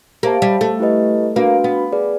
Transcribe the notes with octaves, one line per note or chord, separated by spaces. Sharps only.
A#3 G4 C5 E5 A5
G3
A3
E4 G4 B4 D#5
A#3 D4 F#4 B4
B3
G#4 B4 D5